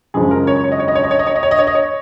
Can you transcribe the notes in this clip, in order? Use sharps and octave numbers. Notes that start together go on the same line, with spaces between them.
F#2 C#3 F3 G#3 G#4
A#4
C#5
C#5
D#5
C#5
D#5
C#5
D#5
C#5
D#5
C#5
D#5
C#5
D#5
C#5
D#5
C#5